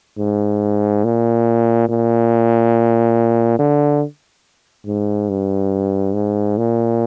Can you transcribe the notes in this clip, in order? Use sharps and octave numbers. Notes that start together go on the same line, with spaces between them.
G#2
A#2
A#2
D3
G#2
G2
G#2
A#2